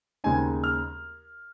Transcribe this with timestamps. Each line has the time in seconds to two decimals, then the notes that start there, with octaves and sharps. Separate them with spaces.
0.24 D#2 C#3 G#3 C4 D#4 G#5
0.64 F6